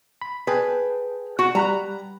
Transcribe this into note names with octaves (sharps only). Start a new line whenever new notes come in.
B5
G#4 B4 G5 A5
F#4
G3 A#5 B5 F#6